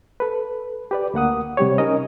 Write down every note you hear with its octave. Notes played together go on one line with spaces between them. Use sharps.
A4 B4
G4 B4 D5
D2 A#3 F#5 D#6
C3 G3 G4 C#5
C#4 D#4 A#4 D#5